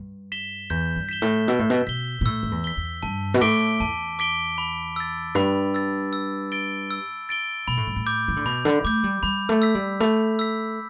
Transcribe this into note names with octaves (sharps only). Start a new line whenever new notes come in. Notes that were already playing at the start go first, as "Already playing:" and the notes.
Already playing: G2
B6 E7 G7
E2 G6
G2
B6 E7 G7
A2
B2 E6
A2
B2
B2 B6 G7
B2
A2 E6
G2
E2
B6 G7
E2
G2 A5
B2
A2 D6 B6 D7 G7
E2 A5
D6 B6 D7 G7
B5
E6 A6
G2 B5
E6 A6
E6
A6 D7 G7
E6
A6 D7 G7
B2 B5
A2
G2
A2
D6 G6
E3
D3
B2 B5
D3
A3 D6 G6
G3
G3 B5
A3
E6 B6
G3
A3 B5
E6 B6